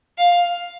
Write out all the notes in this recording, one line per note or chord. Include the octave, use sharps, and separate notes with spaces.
F5